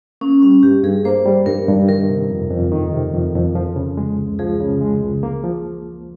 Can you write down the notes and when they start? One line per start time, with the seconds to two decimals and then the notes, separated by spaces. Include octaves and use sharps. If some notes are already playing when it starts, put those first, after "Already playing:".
0.21 A#3 C#4
0.42 G3 C#4
0.63 G2 G4
0.84 G2 G#4
1.05 A#3 C5
1.26 G3
1.46 G2 A#4
1.68 G2
1.89 D#3 A#4
2.09 C3
2.30 F2
2.51 F2
2.72 D#3
2.93 C3
3.14 F2
3.35 F2
3.55 F3
3.76 C#3
3.97 G#3
4.18 C#2
4.39 F3 G#4
4.60 C#3
4.81 G#3
5.02 C#2
5.23 A#3
5.44 F3